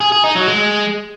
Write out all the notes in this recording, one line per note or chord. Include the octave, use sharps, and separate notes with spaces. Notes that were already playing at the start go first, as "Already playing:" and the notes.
G#4
G#4
D#4
F#3
G#3